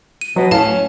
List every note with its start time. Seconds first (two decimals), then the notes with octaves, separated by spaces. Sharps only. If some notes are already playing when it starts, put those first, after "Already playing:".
0.21 D#7
0.36 B2 F#3
0.51 A2 C#4 F5 A5